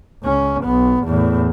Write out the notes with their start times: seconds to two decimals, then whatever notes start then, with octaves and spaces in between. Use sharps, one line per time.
0.23 C#2 C#4
0.64 B1 B3
1.04 E2 A2